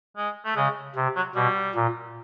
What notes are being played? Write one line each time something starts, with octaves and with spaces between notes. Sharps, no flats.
G#3
A3
C#3 G#3
C3
F#3
B2 G3
A#2